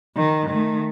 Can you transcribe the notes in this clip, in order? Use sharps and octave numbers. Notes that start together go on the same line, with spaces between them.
D#3
D#3 A3